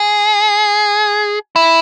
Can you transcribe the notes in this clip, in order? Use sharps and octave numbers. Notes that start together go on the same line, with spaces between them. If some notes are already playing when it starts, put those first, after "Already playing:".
Already playing: G#4
E4